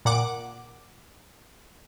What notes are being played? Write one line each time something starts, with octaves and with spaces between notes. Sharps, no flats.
A#2 F#5 D6